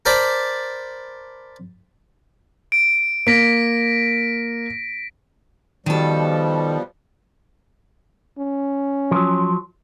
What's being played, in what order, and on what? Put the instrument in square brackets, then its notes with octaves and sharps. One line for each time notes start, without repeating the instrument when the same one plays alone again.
[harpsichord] A#4 C5 D5 A5 B5
[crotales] D7
[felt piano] A#3 [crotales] A#6 B6 D7
[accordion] B2 F3 G3 [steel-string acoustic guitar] D#3 A4
[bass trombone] C#4
[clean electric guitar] F3 F#3